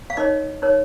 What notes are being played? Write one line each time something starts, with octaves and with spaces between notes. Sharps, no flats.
F5
D#4 A#4 C#5 D#5
D#4 A#4 C#5